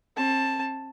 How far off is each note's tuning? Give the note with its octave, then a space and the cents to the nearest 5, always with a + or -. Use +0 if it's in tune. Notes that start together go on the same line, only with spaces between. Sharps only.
C4 +40 A5 +0